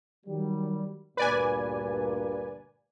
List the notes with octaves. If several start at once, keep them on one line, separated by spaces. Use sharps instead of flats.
D#3 F#3 G3
D2 G2 A#2 B4 D5 G#5